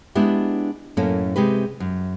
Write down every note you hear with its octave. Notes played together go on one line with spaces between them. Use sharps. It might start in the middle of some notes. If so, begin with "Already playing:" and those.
G#3 B3 D4 E4 G4
F#2 A2 A#3 C#4 A4
C3 G#3 G4 B4
F#2